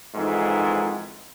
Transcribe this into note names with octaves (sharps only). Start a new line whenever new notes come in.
F2 G#2 D#3 E3